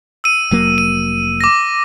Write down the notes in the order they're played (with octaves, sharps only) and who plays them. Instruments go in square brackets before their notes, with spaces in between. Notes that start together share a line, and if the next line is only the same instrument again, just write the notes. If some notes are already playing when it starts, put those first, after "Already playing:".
[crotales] E6 D#7
[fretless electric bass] F1 F#3 A#3
[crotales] D#7
D6 A#6